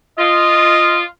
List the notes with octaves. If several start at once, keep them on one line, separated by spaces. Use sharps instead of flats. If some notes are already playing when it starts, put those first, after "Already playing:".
F4 D#5